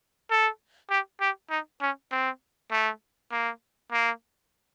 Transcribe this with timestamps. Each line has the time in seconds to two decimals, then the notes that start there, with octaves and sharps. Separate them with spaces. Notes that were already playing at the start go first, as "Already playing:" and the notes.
0.31 A4
0.90 G4
1.21 G4
1.50 D#4
1.82 C#4
2.12 C4
2.72 A3
3.32 A#3
3.92 A#3